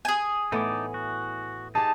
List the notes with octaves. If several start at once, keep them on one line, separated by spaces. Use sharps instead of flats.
G#4 G#5
A2 E3 B3 D#4 A5 D6
F#4
D#4 G4 G#4 A5